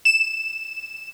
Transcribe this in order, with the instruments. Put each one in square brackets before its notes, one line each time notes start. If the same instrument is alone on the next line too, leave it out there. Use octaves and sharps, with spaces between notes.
[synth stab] E7